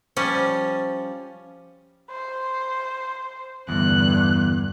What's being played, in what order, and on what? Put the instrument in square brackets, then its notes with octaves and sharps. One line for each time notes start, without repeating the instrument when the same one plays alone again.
[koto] F3 G3 C#4
[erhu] C5
[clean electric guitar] E2 [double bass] G2 D3 [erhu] F#6